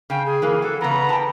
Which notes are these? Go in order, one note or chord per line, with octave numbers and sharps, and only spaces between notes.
C#3 G5
G#4
E3 A#3
F#3 A4
C#3 E3 B3 A#5
G5 A5